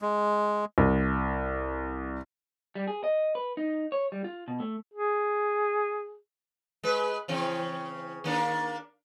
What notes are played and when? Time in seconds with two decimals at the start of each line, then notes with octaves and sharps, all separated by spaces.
0.02 G#3
0.78 C2
2.75 G3
2.88 G#4
3.04 D#5
3.35 B4
3.57 D#4
3.92 C#5
4.12 G3
4.24 F4
4.48 B2
4.60 A3
4.93 G#4
6.84 G#3 B4
7.28 C#3 E3 C4
8.24 D#3 A#3 D4